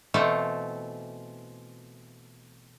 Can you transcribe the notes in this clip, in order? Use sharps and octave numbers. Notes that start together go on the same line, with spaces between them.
B2 E3 A3 C4 F4